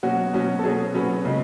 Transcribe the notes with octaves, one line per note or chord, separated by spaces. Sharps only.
B2 F#3 C#4 F#4
B2 F#3 C#4
A4
B2 F#3 C#4 G#4
B2 F#3 C#4 B4
C#3 G#3